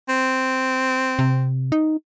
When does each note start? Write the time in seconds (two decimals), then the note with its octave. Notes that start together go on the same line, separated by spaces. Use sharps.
0.09 C4
1.19 C3
1.72 D#4